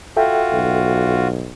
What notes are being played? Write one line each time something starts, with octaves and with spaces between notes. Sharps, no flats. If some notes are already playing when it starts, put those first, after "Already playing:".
F4 F#4 A4 E5 G5
B1